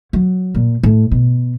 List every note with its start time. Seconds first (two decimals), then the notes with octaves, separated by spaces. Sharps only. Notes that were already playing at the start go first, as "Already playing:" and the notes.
0.13 F#3
0.55 A#2
0.83 A2
1.12 B2